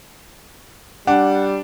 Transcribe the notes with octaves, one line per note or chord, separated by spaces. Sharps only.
G3 D4 F#5